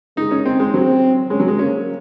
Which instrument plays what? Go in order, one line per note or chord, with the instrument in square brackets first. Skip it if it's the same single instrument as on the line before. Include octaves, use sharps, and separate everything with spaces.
[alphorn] G#3 [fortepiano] D#4
[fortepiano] C#4
C4
G#3
[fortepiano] F#3 [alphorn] C4
[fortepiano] G#3 [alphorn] C#4
[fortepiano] F#3
G#3
[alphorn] A#3 [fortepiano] C#4